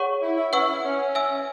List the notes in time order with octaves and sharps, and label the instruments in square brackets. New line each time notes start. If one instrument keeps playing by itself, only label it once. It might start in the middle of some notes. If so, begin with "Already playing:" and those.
Already playing: [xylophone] G#4 C#5 F#5 C#6
[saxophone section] E4
E4
[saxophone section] C#4 [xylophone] B4 F#5 C#6 E6
[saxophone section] E4
C#4
[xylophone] E5 G#5 E6